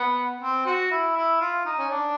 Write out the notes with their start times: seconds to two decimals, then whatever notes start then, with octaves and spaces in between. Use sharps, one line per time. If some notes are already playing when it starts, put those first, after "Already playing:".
Already playing: B3
0.41 C4
0.66 F#4
0.91 E4
1.16 E4
1.40 F4
1.65 D#4
1.79 C#4
1.90 D4